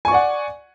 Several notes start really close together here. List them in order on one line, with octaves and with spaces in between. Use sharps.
G#5 C#6 D5 F#5